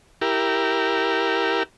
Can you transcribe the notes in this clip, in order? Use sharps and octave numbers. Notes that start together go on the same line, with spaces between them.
E4 G4 A#4